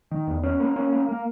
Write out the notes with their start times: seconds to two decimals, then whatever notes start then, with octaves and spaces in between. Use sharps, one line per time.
0.11 D#3
0.27 E2
0.43 C#4
0.60 A#3
0.76 C#4
0.92 A#3
1.09 A#3